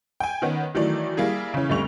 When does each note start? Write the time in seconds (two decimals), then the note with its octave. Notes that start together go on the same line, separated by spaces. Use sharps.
0.20 G5 G#5
0.42 D#3 B3 C#4
0.75 D#3 E3 F#3 A3 D5
1.17 G3 A#3 E4 G#4
1.54 C#3 E3 C#4
1.70 F1 D2 G3 C#6 F7